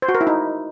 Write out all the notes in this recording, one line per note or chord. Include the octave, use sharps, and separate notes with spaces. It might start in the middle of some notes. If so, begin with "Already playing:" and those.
C5
F#4
A#4
E4
D#4